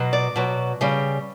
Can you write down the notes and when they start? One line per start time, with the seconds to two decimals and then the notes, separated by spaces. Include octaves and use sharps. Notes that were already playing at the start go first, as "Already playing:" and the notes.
Already playing: B2 F#3
0.13 D5
0.36 B2 F#3
0.81 C#3 G3